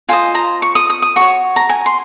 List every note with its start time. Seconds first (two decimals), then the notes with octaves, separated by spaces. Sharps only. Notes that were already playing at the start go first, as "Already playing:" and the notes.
0.09 F4 C5 D#5 G#5
0.35 A#5
0.62 C#6
0.75 D#6
0.90 D#6
1.02 D#6
1.16 F#4 C#5 C#6
1.56 A#5
1.69 G#5
1.86 C6